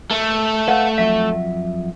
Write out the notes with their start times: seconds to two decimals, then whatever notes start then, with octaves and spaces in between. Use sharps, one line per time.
0.11 A3
0.68 B4 F5 F#5
0.98 F2 F#3 E5